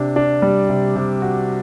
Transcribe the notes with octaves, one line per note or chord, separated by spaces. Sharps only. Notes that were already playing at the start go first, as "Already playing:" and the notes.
Already playing: C3 D4
D4
G3
C3
C3
F#4